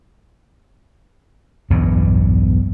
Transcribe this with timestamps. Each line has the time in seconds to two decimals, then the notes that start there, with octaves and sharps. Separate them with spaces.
1.70 B1 E2 G2 B2